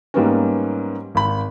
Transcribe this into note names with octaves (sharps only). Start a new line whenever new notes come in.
G#2 G3 A#3 B3 C#4
G#1 B5